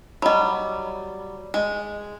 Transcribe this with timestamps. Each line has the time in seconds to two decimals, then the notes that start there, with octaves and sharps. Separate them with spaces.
0.22 F#3 G3 D#5 B5
1.54 G#3